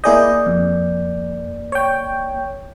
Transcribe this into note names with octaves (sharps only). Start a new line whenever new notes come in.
A#3 E4 G#4 D5 D#5 G6
F2
C#5 G5